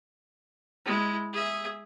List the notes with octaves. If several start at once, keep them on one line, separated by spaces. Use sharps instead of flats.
G#3 E4
G#4 E5